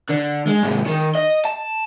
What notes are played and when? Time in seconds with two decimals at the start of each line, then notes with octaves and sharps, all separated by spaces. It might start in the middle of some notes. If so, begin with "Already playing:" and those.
0.10 D3
0.47 G#3
0.63 G#2 C3
0.86 D#3
1.15 D#5
1.45 A5